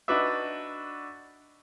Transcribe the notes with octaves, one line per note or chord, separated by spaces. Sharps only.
D4 D#4 F#4 B4 D5 E5